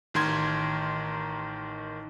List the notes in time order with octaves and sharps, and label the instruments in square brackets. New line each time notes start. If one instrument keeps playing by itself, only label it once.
[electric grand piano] A1 D#3 A#4 C6 G#6